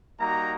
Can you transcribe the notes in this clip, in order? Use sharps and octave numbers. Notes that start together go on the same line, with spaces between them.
G3 A#3 D#4 F#4 A#5